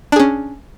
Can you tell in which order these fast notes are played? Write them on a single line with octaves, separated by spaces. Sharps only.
D4 G#4 C#4